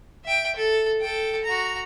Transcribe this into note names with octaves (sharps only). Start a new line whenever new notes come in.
E5 G5
A4
A4 G5
F#4 A#5